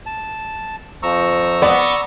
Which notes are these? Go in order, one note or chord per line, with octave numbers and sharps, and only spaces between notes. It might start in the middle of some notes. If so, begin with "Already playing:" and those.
A5
F2 F3 A#5 C#6 E6
B3 D5 D#6